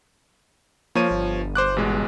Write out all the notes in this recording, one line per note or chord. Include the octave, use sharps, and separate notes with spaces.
F3 A#3 C#5 D#7
G1
C5 D6 F#6
A1 B2 G#3